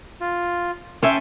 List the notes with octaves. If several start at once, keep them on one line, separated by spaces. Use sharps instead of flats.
F4
C#4 C#5 E5 G5 A5 C6